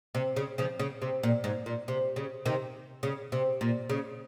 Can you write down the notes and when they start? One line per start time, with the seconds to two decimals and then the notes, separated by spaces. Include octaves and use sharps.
0.15 C3
0.36 C#3
0.58 C#3 F3
0.80 C#3
1.02 C3
1.23 A#2
1.44 G#2
1.66 A#2
1.88 C3
2.16 C#3
2.46 C3 D#3
3.03 C#3
3.32 C3
3.61 A#2
3.90 C#3